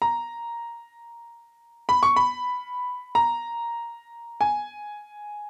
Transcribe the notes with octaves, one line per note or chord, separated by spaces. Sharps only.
A#5
B5
C#6
B5
A#5
G#5